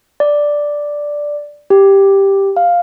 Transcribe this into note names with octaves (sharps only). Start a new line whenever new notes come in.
D5
G4
F5